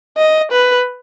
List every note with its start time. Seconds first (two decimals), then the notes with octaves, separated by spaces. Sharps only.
0.18 D#5
0.51 B4